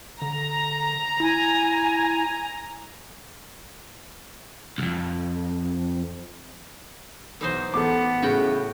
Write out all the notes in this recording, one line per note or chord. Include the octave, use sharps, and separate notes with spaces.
D3 A#5
E4 G#5
C2 F2
B1 E3 D#4 C5
A1 B3 A4 D6
A2 C#3 F#4 B4 G5